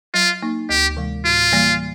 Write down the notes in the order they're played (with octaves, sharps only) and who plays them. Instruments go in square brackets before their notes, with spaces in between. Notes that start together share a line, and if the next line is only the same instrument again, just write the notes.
[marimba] F#3 [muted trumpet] F4
[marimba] A#3 D#4
[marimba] D2 [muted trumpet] G4
[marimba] C3 E3 G#3
[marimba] A2 [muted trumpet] F4
[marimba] E3 G3 A#3